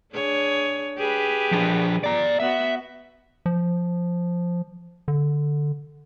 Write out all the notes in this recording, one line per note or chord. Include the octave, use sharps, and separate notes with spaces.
D4 G#4 C#5
G4 G#4 B4
F3 D4
D5 A#5
B3 F#4 E5
F3
D3